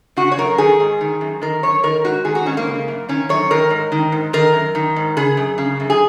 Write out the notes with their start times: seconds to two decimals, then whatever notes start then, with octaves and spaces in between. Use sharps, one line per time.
0.17 C#3 F#4
0.32 C#5
0.37 F#2 A#4
0.58 D#3 G#4
0.80 G#2
1.01 D#3
1.21 F#2
1.41 D#3 A#4
1.63 F#2 C#5
1.83 D#3 A#4
2.04 G#2 F#4
2.25 D#3 G#4
2.35 F#4
2.46 G#2 C#4
2.57 A#3
2.67 C#3
2.88 F#2
3.09 D#3 C#4
3.29 F#2 C#5
3.51 D#3 A#4
3.70 G#2
3.92 D#3
4.12 G#2
4.33 D#3 A#4
4.54 F#2
4.75 D#3
4.96 G#2
5.17 C#3 G#4
5.37 F#2
5.58 C#3
5.80 F#2
5.90 G#4